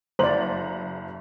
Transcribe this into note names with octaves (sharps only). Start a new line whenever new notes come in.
F#1 C5 D5 A#5 F#7